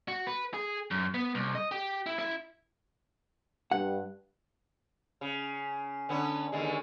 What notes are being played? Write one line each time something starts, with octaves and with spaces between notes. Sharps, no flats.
F#4
B4
G#4
F#2
B3
C2
D#5
G4
E4
E4
G2 F#5
C#3
D3 B3 C#4
D#2 D3 G#3